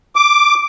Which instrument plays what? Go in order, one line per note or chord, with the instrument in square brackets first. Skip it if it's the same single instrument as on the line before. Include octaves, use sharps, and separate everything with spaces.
[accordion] D6